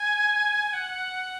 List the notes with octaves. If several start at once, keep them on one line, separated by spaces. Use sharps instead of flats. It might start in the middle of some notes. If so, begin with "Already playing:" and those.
Already playing: G#5
F#5